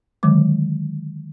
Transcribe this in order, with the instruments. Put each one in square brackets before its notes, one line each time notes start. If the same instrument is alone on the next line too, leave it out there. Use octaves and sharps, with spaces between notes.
[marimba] D3 D#3 F#3 G#3 D6